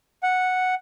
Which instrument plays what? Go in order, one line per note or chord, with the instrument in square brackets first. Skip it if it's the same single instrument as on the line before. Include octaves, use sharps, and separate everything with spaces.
[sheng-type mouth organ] F#5